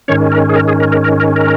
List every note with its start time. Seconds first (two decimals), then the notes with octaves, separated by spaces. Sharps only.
0.08 G#2 D#3 C#4 C#5
0.32 A#4
0.49 G#4
0.56 A#4
0.68 G#4
0.80 A#4
0.92 A#4
1.04 A#4
1.20 A#4
1.36 A#4